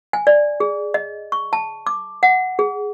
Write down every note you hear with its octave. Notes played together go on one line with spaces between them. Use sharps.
G#5
D5
G#4
D#5
C#6
A5
D6
F#5
G#4